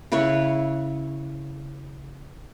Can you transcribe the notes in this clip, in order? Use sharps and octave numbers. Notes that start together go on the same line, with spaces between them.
C#3 E4 B4 C#5